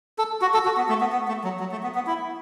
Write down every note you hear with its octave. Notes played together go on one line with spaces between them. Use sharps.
A4
F#4
A4
F#4
B3
A3
B3
B3
A3
F#3
F#3
A3
B3
B3
E4